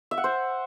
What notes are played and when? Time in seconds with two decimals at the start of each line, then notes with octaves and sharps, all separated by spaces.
0.11 E5
0.18 F#5
0.24 C5